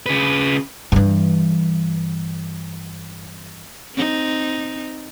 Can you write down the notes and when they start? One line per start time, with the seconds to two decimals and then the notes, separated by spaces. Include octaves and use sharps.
0.06 C#3 B4
0.92 G2 E3
3.95 C4 D#4